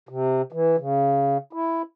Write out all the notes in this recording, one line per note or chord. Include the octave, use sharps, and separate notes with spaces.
C3
E3
C#3
E4